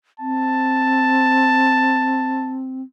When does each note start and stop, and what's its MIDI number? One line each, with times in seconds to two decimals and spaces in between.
0.20 2.81 60
0.20 2.58 81